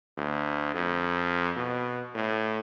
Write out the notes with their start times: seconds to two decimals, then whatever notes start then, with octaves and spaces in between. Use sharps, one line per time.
0.18 D2
0.75 F2
1.57 B2
2.15 A2